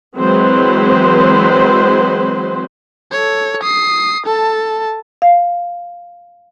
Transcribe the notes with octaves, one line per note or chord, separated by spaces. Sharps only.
E3 F#3 G#3 C4 B4 C5
A4 C#5
D#6 C7
A4 A5
F5